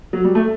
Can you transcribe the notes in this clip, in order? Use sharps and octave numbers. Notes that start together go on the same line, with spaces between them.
F#3
G3
A3